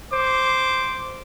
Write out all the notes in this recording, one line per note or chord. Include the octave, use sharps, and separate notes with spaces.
C5 D6